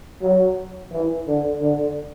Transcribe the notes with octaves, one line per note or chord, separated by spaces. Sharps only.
F#3
E3
D3
D3